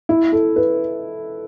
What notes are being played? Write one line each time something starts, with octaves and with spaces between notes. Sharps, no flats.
E4
A4
B4